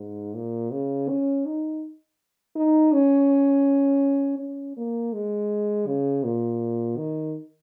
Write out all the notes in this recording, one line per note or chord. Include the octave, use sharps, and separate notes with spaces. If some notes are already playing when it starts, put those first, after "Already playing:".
Already playing: G#2
A#2
C#3
C#4
D#4
D#4
C#4
C#4
A#3
G#3
C#3
A#2
D#3